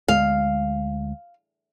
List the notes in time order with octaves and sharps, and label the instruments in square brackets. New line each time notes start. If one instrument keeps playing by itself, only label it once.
[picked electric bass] D2 G#3 [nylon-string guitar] F5